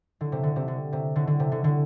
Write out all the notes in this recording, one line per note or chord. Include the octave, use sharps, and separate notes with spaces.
D3
C3
D3
C3
D3
C3
D3
D3
C3
D3
D3